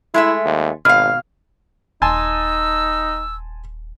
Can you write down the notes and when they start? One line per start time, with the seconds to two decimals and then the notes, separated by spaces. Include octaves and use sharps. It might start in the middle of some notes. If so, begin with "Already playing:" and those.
0.14 G#3 A3 E4 E5
0.45 D#2
0.85 G#1 B2 F5 F6
2.02 D#1 D#4 G#5 A5 C6 E6